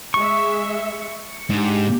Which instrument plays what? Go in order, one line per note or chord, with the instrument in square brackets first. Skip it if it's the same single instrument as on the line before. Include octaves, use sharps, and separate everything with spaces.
[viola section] G#3 E5 [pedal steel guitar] C#6
[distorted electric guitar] G#2 [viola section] D4 G4